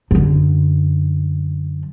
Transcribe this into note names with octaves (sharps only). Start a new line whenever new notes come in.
F#2 D3